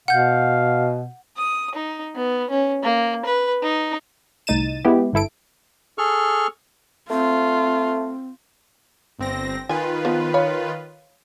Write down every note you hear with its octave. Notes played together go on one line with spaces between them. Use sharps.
B2 F5 F#5 G6
D#6
D#4
B3
C#4
A#3
B4
D#4
C2 A2 D#4 A6 D#7 E7
G#3 B3 E4 G4
G1 G2 E4 A4 D7
G#4 A4 C#6 F6
A3 C4 F4
G1 C4 A#6
D#3 F4 B4 G#5
F3 B3
C#5 F5 B5